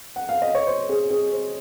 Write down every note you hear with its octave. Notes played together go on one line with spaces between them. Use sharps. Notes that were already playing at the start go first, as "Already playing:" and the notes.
F#5
F5
D#5
C#5
C5
G#4
G#4
C5